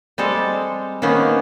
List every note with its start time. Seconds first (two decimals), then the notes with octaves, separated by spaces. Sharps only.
0.18 G3 G#3 C4 A4
1.02 D#3 A#3 B3 C#4 C5